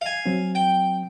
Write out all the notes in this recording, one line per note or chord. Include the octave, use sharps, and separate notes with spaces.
F5 G#5
F#3 C4
G5